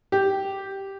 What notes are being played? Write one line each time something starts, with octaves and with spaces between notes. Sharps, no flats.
G4